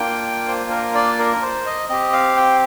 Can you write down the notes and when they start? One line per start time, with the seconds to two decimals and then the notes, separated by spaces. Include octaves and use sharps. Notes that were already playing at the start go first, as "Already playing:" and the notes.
Already playing: A#3 D4 F4 G5
0.48 C5
0.71 A#4
0.95 D5
1.19 A#4
1.43 C5
1.66 D#5
1.89 C4 G4 D#5
2.13 F5
2.37 G5